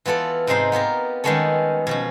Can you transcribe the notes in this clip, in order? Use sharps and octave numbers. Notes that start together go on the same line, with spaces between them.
E3 B3 F4 A4 D5
G#2 C3 G#3 D#4 C5
B3 F4 G4 A#4
D#3 G3 G#3 B3 C#4 A4
B2 F3 C#4